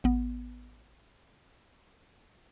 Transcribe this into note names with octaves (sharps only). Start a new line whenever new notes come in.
A1 B3